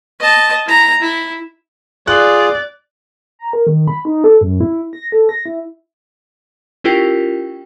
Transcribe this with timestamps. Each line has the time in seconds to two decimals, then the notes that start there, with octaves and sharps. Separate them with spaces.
0.19 D#5 A5
0.66 E4 A#5
1.01 E4
2.07 F4 G#4 D5 F#6
3.39 A#5
3.53 A#4
3.67 D#3
3.88 B5
4.05 D#4
4.24 A4
4.41 F#2
4.60 E4
4.93 A#6
5.12 A4
5.29 A#6
5.46 E4
6.84 C#4 E4 F4 G4 A#4 G5